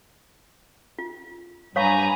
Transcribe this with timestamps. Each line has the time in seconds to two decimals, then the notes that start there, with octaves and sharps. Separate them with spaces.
0.99 F4
1.76 G2 B4 C#5 F5 G#5 A#5 C#6